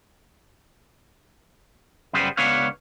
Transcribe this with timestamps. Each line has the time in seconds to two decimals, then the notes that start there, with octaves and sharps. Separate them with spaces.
2.13 F#2 C#3 G3 B3 B4 C5
2.37 C#2 B3 D4 B4 C#5 F5